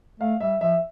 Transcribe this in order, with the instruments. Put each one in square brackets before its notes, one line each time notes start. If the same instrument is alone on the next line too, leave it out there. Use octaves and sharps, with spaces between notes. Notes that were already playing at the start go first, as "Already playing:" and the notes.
[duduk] A3 [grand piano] F5
[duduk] G3 [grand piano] E5
[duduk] F3 [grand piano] E5